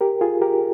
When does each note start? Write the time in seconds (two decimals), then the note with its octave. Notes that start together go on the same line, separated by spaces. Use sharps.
0.01 G4 A#4
0.21 F4 G#4
0.42 G4 A#4